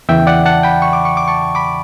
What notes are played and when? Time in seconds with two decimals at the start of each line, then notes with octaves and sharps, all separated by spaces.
0.09 E2 C#3 E3 E5 G5
0.27 D5 F#5
0.46 F#5 A5
0.63 G5 B5
0.82 C#6
0.93 D6
1.05 C#6
1.17 D6
1.28 A5 C#6
1.55 B5 D6